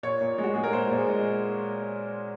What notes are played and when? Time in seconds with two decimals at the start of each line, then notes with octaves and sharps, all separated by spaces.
0.03 A#2 C#5
0.21 A#2
0.38 G#3
0.43 F#4
0.54 G#3 G#4
0.64 A#4
0.73 A#2 C5
0.91 A#2
0.97 G#4
1.08 G#3